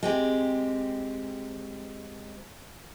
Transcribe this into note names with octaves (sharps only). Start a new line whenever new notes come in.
G#3 C4 G4